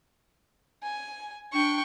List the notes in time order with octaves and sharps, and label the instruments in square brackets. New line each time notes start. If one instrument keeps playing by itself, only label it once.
[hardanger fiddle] G#5
[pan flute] D4 [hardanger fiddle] G5 C#6